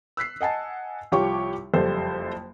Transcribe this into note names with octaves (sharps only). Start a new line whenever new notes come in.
E6 F#6 B6 C7
D#5 F#5 G#5 A5
C2 F3 G4 C#5 C#6 D6
F#1 F2 G3 A4 C5